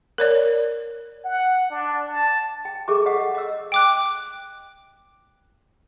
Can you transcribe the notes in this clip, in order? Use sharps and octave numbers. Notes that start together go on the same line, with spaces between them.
A#4 C#5 D5
F#5
D4
A5
G5
G#4 A4 E5 C#6 D6
D5 D#5 F5 F#5 D#6
D#5 F5 E6
G5 D6 F#6